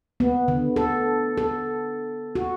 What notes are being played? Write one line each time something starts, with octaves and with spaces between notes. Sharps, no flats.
B3
D3
A4
A4
F#4